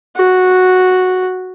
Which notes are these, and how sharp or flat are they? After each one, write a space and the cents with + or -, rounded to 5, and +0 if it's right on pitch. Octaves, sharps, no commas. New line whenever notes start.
F#4 -5